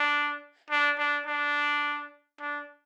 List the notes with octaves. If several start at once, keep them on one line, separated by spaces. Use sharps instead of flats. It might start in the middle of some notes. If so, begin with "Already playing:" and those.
Already playing: D4
D4
D4
D4
D4